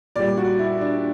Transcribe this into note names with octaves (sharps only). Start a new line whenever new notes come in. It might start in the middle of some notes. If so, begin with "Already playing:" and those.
A#2 G3 D5
F#4
E4
D4